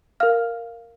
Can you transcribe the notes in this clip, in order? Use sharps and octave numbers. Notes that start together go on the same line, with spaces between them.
A#4 F5 F6